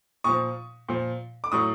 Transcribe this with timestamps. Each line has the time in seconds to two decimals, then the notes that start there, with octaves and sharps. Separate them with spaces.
0.24 A#2 F3 C#6 D#6
0.89 A#2 F3
1.44 D6
1.52 A2 F#3 C#6 D#6